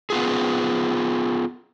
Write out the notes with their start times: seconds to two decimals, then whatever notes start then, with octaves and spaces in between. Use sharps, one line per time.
0.10 B3 F4 G#4